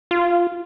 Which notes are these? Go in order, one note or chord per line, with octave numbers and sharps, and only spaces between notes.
F4